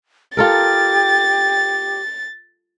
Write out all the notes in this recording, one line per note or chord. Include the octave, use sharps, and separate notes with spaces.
F4 G4 A4 A#4 A6